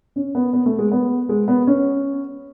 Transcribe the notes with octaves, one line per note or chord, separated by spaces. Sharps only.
C#4
B3
B3
A3
G#3
B3
G#3
B3
C#4